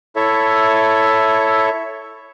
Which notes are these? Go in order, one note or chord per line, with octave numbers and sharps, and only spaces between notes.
E4 A4 C#5 E5